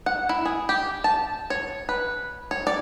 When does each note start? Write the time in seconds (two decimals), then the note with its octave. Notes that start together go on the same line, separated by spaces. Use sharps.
0.06 F#5
0.29 E4
0.45 G#4
0.69 G4
1.04 A5
1.50 C#5
1.89 B4
2.51 C#5
2.67 D5